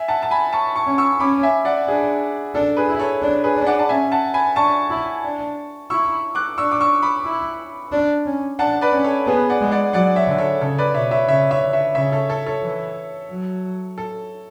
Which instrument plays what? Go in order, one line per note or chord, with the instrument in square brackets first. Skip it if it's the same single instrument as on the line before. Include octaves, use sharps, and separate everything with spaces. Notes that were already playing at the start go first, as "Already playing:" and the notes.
Already playing: [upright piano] E5 G#5
F#5 A5
A5
G#5 B5
A5 C#6
A5 C#6
[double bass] C#4
[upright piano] C#6 E6
[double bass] C#4 [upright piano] B5 D6
[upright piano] E5 G#5
D5 F#5
[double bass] D4 [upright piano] G#4
[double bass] D4 [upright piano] A4
[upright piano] G#4 B4
[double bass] E4
[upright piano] A4 C#5
[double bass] D4
[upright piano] G#4 B4
[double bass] D4
[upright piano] D5 F#5
A5
[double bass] C#4 [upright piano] E5 G#5
[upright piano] F#5 A5
G#5 B5
[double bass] D4 [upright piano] A5 C#6
[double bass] E4
D4
[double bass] E4 [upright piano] C#6 E6
[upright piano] D6 F#6
[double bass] D4 [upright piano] C#6 E6
[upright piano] D6
C#6 E6
B5 D6
[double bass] E4
D4
C#4
[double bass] D4 [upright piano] F#5 A5
[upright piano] B4 D5
[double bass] C#4
[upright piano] A4 C#5
[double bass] B3 [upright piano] G#4 B4
[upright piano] D5 F#5
[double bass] G#3
[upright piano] D5 F#5
[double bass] F#3 [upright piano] D5 F#5
[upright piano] C#5 E5
[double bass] D3
[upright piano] A4 C#5
[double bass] C#3 [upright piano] A4 C#5
[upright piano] B4 D5
[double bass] B2 [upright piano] C#5 E5
[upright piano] C#5 E5
[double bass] C#3 [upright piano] C#5 E5
[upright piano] C#5 E5
[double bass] D3
[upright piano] C#5 E5
[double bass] C#3 [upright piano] C#5 E5
[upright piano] A4 C#5
A4 C#5
A4 C#5
[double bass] E3
F#3
[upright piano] A4